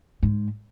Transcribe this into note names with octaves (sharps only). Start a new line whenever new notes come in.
G#2